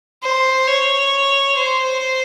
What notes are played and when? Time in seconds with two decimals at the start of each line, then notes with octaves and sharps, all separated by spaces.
0.23 C5
0.68 C#5
1.57 C5